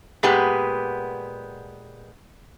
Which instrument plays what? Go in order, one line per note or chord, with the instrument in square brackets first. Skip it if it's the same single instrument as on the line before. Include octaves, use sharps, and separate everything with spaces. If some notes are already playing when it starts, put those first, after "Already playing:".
[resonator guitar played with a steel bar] A#2 G#3 B3 G4